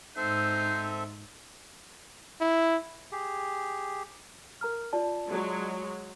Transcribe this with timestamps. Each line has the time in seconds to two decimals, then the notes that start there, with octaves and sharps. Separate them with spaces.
0.17 G#2 C4 D#4 A4 C5 E5
2.41 E4
3.12 G4 G#4
4.61 A#4 A#5 F6
4.93 F4 D5 A5
5.30 F#3 G#3